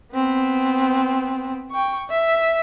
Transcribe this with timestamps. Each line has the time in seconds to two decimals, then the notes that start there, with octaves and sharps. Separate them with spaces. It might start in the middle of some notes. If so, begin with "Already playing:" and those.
0.13 B3 C4
1.72 G5 C#6
2.09 E5